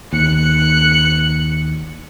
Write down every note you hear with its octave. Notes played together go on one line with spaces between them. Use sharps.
D#2 F#6 C#7